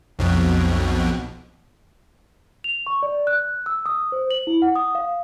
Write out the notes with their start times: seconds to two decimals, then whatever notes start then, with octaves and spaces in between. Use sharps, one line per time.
0.19 B1 F2 B2
2.64 F7
2.87 C#6
3.03 D5
3.27 F#6
3.66 E6
3.86 D#6
4.12 C5
4.31 F#7
4.47 E4
4.62 F#5
4.76 D#6
4.95 F5